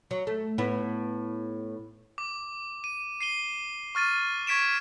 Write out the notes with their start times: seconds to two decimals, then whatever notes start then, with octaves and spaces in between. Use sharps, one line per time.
0.11 F#3
0.27 A3
0.58 A2 B3 E4
2.18 D6
2.84 D#7
3.21 C7 D#7 G7
3.95 C#6 F6 A6 D#7
4.47 C#6 G#6 B6 D7 E7